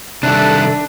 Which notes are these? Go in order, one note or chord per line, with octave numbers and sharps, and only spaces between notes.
C3 D#3 G3 D4 A4 E5 F#6